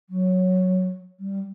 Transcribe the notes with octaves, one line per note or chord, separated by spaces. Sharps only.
F#3
G3